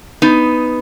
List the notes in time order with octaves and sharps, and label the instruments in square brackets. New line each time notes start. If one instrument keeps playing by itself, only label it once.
[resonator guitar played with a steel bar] B3 D#4